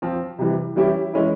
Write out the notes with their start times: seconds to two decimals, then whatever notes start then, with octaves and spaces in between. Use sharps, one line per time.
0.02 F3 C4 F4
0.39 C3 E3 G3
0.76 E3 G3 C#4 E4 G4
1.14 E3 G#3 C#4 E4